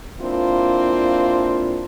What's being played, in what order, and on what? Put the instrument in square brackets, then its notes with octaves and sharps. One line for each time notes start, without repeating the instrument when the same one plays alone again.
[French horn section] A#3 C4 D4 E4 F4